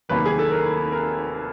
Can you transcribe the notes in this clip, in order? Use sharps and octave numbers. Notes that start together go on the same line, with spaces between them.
F1 D#2 D#3 F#3 A#3 B4
G#4
A4
A#4
A#4